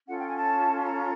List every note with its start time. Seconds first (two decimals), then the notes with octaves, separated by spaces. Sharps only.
0.07 C#4 F4 A4 F#5
0.17 G5
0.27 G#5
0.37 A5
0.84 A#5